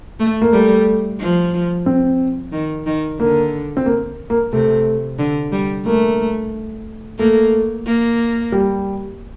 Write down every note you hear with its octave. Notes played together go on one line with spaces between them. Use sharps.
A3
A#3
G3 A3
F3
C4
D#3
D#3
D3 A#3
C4
A#3
A#3
C3 A3
D3
G3
A3 A#3
A3 A#3
A#3
G3